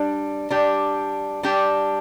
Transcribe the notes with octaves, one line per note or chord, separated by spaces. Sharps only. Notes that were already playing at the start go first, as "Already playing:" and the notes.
Already playing: G3 D4
G3 D4 G4
G3 D4 G4